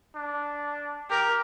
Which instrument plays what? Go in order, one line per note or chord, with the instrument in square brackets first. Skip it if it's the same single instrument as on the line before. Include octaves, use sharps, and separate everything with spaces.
[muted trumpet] D4
[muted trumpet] G4 [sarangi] A#4